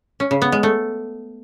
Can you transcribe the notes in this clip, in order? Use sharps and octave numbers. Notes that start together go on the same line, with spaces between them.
C#4
C#3
B3
G#3
A3